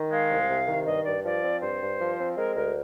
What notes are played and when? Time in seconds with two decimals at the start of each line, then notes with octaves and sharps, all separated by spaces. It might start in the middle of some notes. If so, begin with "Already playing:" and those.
Already playing: D#3
0.11 G#3 F5
0.30 C2
0.49 C3
0.68 D#3
0.86 G2 D#5
1.05 G2 D5
1.24 F3 D5
1.43 C4
1.61 G2 C5
1.81 G2
2.00 F3
2.19 C4
2.37 G#3 A#4
2.56 D2 A#4